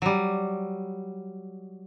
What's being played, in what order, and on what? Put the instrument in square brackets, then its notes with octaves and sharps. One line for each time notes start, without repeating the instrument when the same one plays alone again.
[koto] F#3 G3